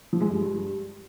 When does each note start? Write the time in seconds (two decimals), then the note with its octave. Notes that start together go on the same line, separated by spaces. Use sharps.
0.13 F3
0.21 G#3
0.28 G2